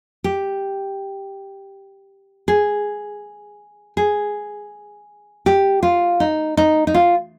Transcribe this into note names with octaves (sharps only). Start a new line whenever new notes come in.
G4
G#4
G#4
G4
F4
D#4
D#4
D#4
F4